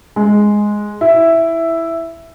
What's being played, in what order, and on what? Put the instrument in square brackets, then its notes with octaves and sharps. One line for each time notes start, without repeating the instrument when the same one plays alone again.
[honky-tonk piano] G#3
E4